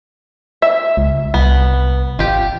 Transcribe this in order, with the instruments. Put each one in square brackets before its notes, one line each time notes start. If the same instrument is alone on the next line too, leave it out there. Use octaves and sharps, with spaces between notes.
[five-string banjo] E5
[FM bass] C#2
[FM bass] C2 [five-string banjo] B3
[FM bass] G#1 [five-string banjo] F4 G4